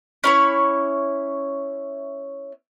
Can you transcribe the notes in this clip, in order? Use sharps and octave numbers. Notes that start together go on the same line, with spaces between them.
C#4 E4 C#5